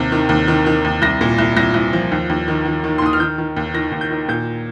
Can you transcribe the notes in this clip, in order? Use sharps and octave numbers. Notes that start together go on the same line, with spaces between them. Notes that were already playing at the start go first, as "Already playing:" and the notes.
Already playing: D#2 C3
D#3
D#2
D#3
D#3
D#2
C2 A#6
A#2
C2
C2 A#6
C2
F3
D#2
D#2
D#3
D#3
D#3
C6
D#2 D#6
F6
D#3 G6
D#3
D#2
D#3 A#6
D#2
G6
D#3
A#2 G6